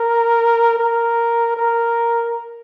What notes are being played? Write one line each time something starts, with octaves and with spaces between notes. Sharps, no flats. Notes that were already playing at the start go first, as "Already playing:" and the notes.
Already playing: A#4
A#4
A#4